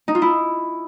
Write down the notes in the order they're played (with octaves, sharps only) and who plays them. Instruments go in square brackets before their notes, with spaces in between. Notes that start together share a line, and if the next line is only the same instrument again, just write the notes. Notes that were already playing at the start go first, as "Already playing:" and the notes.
[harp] D#4
F4
E4